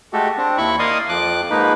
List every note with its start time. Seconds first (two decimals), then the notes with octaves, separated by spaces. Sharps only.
0.13 G#3 A3 F#4 G4 A4
0.37 C4 D4
0.58 D#2 E4 B5 C#6
0.79 A#3 D5 D#5 F5 C6 D#6
1.09 F2 F3 D6 F#6
1.50 G#2 F3 A#3 D#4 B4